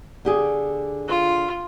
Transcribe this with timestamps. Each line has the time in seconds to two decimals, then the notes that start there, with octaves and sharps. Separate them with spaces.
0.25 D3 G4 G#4
1.08 F4